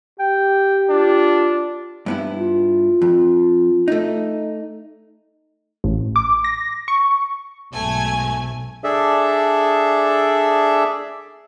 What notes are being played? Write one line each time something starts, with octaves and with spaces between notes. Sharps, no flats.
G4 G5
D4 F4
G2 B3 E4
F4
F2
A3 D#4
A1
D6
A#6
C#6
B1 G#2 A3 G#5
D4 G#4 A4 D5 E5